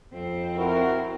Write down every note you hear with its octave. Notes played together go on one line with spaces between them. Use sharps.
F2 C4
E4 F#4 A#4